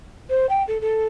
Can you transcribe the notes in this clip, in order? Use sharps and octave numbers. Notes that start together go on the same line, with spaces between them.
C5
G5
A4
A4